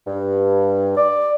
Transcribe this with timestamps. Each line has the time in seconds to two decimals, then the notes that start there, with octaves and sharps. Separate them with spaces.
0.07 G2
0.96 D5